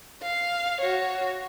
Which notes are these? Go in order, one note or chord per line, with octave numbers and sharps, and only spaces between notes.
F5
F#4 C#5